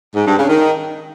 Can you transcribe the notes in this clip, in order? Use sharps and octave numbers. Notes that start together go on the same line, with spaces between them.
G#2
G2
C#3
D#3